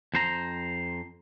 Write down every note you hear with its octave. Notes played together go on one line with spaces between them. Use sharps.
F2 C5 A#5